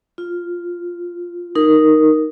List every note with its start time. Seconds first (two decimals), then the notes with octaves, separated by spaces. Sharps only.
0.18 F4
1.55 D#4 A#4